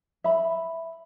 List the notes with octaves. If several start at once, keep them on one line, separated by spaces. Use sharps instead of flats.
E5 B5